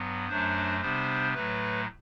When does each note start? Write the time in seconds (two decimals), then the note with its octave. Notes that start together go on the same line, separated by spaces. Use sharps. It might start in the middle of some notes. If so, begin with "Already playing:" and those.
Already playing: G2 F#3 B3
0.28 F#2 F#3 A3 D4 C5
0.81 C3 G3 B3 D4 C5
1.34 A2 F#3 A3 B4